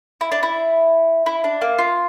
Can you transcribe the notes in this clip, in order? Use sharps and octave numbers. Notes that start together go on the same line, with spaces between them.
E4
D4
E4
E4
D4
A#3
F4